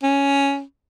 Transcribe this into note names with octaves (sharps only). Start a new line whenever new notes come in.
C#4